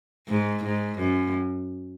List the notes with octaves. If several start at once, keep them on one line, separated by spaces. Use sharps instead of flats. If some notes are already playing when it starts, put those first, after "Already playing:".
G#2
G#2
F#2